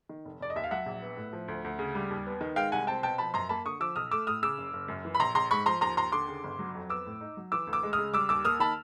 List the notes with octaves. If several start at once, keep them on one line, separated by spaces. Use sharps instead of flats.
D#3
F1
F1 D5
D#5
D#2 E5
F5
F#3 E5 F#5
A#1
B3
A2
F3
D2
D2
C#3
G3
D#2
B3
D#3
G#3 F5 G5
C2 F#5 G#5
C4 G5 A5
B2 G5 A5
F3 A5 B5
F#2 A#5 C6
A#3 A5 B5
D3 C#6 D#6
F3 D6 E6
B1 D#6 F6
A3 D6 E6
A2 D#6 F6
C#3 D6 E6
F#1
F#1
F#2
E3
B5
A#1 A#5 C6
A#1 A#5 C6
G#2 B5 C#6
F3 A#5 C6
D#2 A#5 C6
D#2 A#5 C6
D3 C6 D6
C#3
G1
F#3
F2
B3 D6 E6
A2
D#4
F#3
E3 D6 E6
D2
D6 E6
G#3
D#6 F6
C#3
G3 D6 E6
D#2 D6 E6
A#3 D#6 F6
D#3 A5 B5